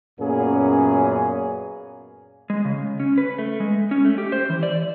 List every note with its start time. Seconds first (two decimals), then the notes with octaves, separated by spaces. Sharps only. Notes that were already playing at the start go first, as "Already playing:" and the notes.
0.19 F#2 A#2 A#3 B3 C#4 G#4
2.50 G#3
2.65 C#3
3.00 C#4
3.18 B4
3.38 A3
3.60 G#3
3.91 C#4
4.05 A3
4.18 G4
4.32 C5
4.50 E3
4.63 D5